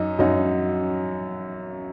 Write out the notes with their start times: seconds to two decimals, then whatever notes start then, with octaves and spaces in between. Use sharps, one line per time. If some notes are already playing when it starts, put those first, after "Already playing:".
Already playing: F#2 F#3 D#4
0.19 F#2 F#3 D#4 F#4